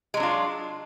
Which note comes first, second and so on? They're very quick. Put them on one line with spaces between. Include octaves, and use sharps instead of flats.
G#3 F#3 D4 F4